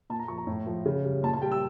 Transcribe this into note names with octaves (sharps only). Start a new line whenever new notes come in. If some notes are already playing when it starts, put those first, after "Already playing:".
A#2 A5
A#5
F3 C#6
A#5
A2
F3
C#3
G3
A#2 A5
A5
G3 G5
E6